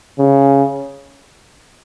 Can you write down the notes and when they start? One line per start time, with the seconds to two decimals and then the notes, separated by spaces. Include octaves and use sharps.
0.19 C#3